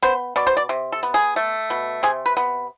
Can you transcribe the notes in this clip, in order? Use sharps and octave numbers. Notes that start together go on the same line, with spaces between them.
B3 C5
B2 D5
C5
D5
C3
A4
B3
G#4
A3
B2
C3 G#4
B4
B3